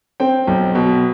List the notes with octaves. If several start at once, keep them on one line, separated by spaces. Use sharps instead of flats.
C4 G5
B1
B2